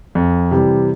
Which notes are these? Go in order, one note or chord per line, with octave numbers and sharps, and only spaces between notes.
F2
C3 E3 G3